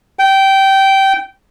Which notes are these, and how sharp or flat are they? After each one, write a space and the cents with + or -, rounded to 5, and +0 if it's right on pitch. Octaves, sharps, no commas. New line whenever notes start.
G5 -15